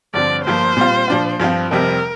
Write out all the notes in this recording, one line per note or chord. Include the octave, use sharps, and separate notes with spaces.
G2 D3 F3 C4 D5
G1 G2 F3 A#3 F4 C5
A#2 G3 C4 F4
A#2 F3 D4 F4
G2 F3 C4 F4
F1 F2 C3 G3 C4 A#4